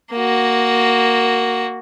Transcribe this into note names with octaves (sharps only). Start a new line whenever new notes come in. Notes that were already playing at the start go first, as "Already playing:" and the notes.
A#3 F#4